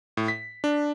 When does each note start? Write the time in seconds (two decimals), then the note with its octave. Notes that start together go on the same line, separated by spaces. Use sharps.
0.17 A2
0.28 B6
0.64 D4